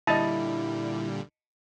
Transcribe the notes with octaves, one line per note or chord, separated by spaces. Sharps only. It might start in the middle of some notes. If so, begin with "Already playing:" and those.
A#2 D3 G3 E4 D#5 A5